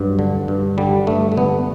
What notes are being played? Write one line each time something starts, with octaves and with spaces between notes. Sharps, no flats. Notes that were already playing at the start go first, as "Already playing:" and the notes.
Already playing: G2 F#3
D3
G2
D3 G3
G2 A3
A3
D3 B3